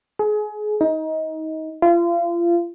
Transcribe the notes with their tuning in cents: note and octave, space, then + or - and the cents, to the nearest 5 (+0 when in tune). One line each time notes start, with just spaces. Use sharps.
G#4 +25
D#4 +25
F4 -30